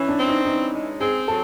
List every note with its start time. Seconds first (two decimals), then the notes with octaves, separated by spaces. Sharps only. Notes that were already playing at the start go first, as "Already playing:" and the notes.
Already playing: E3 C#4
0.08 D4
0.18 C4
0.27 D#4
0.45 E3 D#4
0.73 G#3
1.01 C4 G#4
1.28 F#3 A4